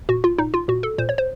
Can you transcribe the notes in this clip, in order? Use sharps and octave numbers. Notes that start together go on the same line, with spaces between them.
A#2 F#4
F4
A#2 D#4
F4
A#2 F#4
A4
A#2 C5
C#5
C5